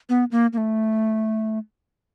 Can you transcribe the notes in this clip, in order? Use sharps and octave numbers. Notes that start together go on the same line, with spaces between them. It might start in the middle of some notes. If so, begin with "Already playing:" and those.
B3
A#3
A#3
A3